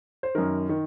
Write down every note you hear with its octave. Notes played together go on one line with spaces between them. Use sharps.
C5
F#2 D#3 A#4
D#3